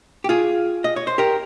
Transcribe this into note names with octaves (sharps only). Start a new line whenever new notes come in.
G4
F4 G#4
D#5
C#5
C5
G4 A#4